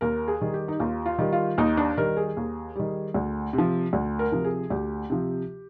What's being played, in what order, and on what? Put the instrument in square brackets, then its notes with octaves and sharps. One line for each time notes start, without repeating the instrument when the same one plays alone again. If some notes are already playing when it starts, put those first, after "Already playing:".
[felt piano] D#2 A#4
G#4
D#3 G3
G4
D#4
D#2 F4
F4
D#3 G3
F4
D#2 D#4
D4
D#3 G3 A#4
G#4
D#2
D#3 G3
D2
C3
F3
D2
A#4
C3 F3
G#4
D2 G4
C3 F3